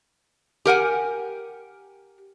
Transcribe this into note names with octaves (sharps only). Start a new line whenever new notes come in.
G4 A#4 F#5 G#5